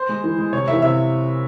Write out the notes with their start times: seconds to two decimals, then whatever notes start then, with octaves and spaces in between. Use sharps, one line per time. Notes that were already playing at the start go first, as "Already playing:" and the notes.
Already playing: C5
0.09 G#3
0.24 E3
0.39 G#3
0.52 C3 C#5
0.68 E3 A#3 E5
0.82 C3 E5